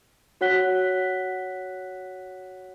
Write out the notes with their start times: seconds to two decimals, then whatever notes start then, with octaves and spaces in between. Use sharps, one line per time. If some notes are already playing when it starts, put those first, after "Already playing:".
0.41 F#4 C#5 F#5 F#6 B6 G7